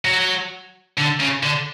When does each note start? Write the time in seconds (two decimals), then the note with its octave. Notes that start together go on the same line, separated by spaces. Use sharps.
0.05 F#3
0.98 D3
1.20 C#3
1.43 D3